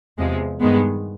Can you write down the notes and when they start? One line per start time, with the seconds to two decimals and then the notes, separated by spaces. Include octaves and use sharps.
0.19 E2 C3 F3 G#3
0.61 G2 D#3 G#3 B3